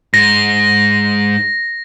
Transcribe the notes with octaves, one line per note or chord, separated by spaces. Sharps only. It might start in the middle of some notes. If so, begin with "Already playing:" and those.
G#2 A#6